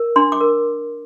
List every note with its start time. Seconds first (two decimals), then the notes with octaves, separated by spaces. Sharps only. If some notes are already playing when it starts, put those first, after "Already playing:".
Already playing: A#4
0.16 D4 C6
0.32 D6
0.41 A#4